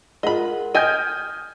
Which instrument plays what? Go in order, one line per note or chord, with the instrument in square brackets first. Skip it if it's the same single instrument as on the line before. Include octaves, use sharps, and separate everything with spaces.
[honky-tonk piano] G#3 F4 [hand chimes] A#4 F#5 [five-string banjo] D#5 B5
[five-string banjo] D#5 G5 G#5 [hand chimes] D#6 F6 [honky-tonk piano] G6 G#6 D#7